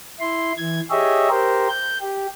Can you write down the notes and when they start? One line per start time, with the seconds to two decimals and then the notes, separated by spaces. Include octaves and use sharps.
0.20 E4 C6
0.57 E3 G#6
0.90 G4 G#4 C#5 D#5 E5
1.30 G4 A#4 C5
1.69 G6
2.01 G4